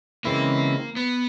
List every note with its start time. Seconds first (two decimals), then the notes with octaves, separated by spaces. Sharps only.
0.24 C#3 E3 G#3 A#3 C4 E4
0.96 B3